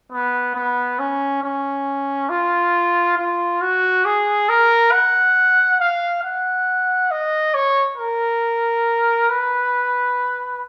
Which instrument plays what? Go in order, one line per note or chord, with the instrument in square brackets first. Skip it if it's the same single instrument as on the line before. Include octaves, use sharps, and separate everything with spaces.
[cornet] B3
B3
C#4
C#4
F4
F4
F#4
G#4
A#4
F#5
F5
F#5
D#5
C#5
A#4
B4